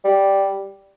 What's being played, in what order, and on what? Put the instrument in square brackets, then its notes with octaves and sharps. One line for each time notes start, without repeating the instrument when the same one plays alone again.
[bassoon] G3